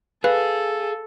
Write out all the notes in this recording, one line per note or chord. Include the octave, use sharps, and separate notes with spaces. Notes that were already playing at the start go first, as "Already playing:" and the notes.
G#4 A4 B4 F5